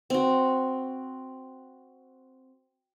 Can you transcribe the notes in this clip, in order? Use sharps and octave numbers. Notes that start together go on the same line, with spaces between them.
C4 F#4